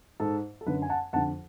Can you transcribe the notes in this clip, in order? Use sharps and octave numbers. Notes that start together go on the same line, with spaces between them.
G#2 A4
A4
F#2 D3 B4
G#5
F#5 A5
F2 D3 F#5 A5